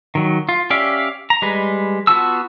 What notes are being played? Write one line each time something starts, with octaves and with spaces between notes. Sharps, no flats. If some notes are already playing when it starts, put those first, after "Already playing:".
D#3 F#3
F4
C#4 G4 D5 E5 F5
A#5
G3 G#3 B4
B3 F4 F#4 A5 E6